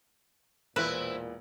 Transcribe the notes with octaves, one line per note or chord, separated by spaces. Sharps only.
E1 A#2 E3 C4 E4 B4